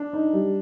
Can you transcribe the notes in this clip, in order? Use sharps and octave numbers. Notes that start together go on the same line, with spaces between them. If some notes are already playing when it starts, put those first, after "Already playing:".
Already playing: D4
D#4
G3